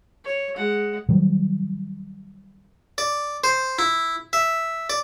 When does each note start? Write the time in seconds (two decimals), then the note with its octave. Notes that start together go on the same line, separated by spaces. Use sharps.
0.25 C#5
0.56 G#3 F#5
1.09 D#3 F#3 G3
2.98 D5
3.44 C5
3.79 E4
4.33 E5
4.90 D5